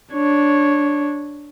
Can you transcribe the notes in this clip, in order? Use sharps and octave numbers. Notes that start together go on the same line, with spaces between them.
D4 C#5